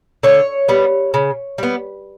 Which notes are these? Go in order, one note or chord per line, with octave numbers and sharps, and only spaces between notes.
D3 C#5
G3 B3
C#3
G3 B3